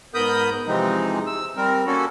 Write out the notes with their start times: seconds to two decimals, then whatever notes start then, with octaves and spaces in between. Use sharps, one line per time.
0.14 G#2 B3 A#4 B5 D#6 G6
0.53 B3
0.67 C3 E3 F3 G#3 C4 D#4
1.26 E6
1.57 G3 C4 A#4
1.87 A#3 C#4 F#4 A4